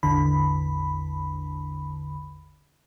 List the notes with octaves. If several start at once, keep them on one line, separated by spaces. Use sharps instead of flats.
A1 E2 D3 B5